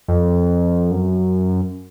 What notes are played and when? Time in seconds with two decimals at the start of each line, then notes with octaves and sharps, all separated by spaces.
0.08 F2
0.91 F#2